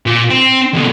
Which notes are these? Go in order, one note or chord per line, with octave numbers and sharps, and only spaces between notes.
A#2
C4
B2 D3